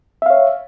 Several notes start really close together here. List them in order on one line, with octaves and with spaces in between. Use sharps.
E5 F5 C#5